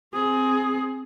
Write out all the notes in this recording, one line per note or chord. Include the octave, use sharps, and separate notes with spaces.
C4 G#4